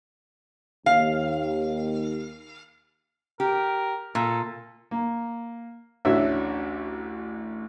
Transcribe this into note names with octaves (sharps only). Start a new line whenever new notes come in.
D#2 F5
G4 A#4
A#2 A4
A#3
A1 D2 C#4 D4 F#4 E5